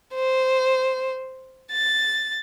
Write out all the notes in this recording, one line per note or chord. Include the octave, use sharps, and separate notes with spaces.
C5
A6